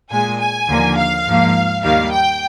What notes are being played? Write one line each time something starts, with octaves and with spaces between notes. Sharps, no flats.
A#2 G#3 G#5
G#5
D#2 D3 F3 A#3
F5
G#2 F3 A#3
D#2 D#3 G3 A#3 F5
G5